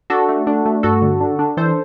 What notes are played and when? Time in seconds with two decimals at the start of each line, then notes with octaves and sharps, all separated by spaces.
0.10 D4 F#4 A4
0.29 A3
0.47 D4
0.66 A3
0.83 G2 F#4 A4
1.02 D3
1.20 D4
1.39 D4
1.57 E3 A4 C5